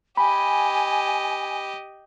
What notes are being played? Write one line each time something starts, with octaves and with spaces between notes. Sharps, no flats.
G4 D#5 G#5 B5